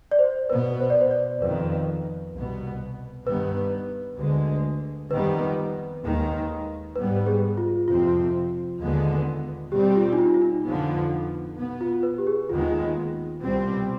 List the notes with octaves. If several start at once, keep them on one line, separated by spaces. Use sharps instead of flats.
D5
C5
B2 B3 B4
C5
D5
C5
D5
F2 D#3 B3 B4
C2 B2 B3
G2 D#3 B3 B4
D2 D3 G#3
F2 D#3 G3 B3 B4
D#2 D#3 G#3
G#2 G3 B3 B4
B4
G#4
F4
F2 C3 F3 C4 F4
D#2 D3 G#3 B3
B2 G3 C4 G4
G4
F4
D#4
F4
F4
D#4
F2 D3 F3 B3
B2 B3
F4
B4
G4
G#4
D#2 D#3 G#3 B3 F4
C2 B2 G3 C4